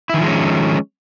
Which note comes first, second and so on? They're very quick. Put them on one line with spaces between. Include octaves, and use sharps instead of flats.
E4 D#3 F3 G#3 C#4